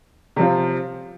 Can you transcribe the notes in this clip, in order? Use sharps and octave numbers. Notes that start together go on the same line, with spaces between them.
C3 F3 C4 F4